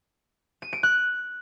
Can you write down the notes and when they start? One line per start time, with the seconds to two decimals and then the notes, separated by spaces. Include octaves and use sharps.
0.62 D#7
0.73 D7
0.83 F#6